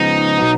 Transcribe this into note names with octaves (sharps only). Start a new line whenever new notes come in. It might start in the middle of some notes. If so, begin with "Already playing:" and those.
Already playing: C#3 F3 G#3 B3 D#4
B2 F#3 B3